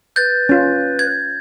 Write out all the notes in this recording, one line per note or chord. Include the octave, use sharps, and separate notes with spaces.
B4 G6 A6
C#4 F4
G#6